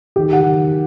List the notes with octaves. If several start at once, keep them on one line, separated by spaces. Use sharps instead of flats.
D#3 G4
D#3 F#5